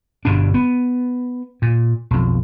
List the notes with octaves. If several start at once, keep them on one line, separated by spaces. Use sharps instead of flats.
G1 G2 B2 D4
B3
A#2
B1 F2